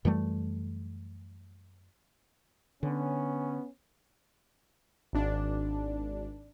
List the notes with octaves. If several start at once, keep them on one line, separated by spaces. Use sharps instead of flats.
F#2 E3 G3 A3
D3 B3 C#4
G#1 D4